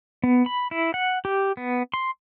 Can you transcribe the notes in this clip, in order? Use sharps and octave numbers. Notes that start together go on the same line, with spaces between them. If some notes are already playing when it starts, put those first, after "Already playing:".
B3
B5
E4
F#5
G4
B3
C6